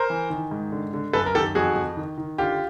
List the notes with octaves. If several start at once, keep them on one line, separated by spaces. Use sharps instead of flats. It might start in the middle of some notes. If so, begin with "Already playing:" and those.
Already playing: A#4 C5
E3
D#3
G#2
D3
D3
F#2 A4 B4
A#4
D#3 G4 A4
F2 F#4 G#4
F2
D#3
D#3
D3 F4 G4